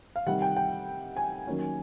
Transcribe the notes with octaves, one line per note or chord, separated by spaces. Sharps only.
F5
C3 D#3 G3 F#5
G5
G5
G#5
D#3 F#3 A#3 C#4